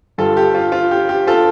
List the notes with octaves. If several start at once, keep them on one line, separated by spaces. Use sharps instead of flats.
G2 D3 G3 F4 A4
G4
F4
F4
G4
G4
F4 A4